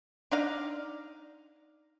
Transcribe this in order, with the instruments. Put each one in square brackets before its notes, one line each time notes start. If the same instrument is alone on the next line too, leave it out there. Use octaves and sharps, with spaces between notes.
[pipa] D4 D#4 F5